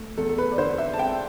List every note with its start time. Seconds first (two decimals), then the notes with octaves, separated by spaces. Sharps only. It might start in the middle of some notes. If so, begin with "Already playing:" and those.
Already playing: A3
0.18 E2 A4
0.29 A4
0.38 B4
0.52 D5
0.58 D3 C5
0.78 E5
0.93 A5
0.99 C4 G5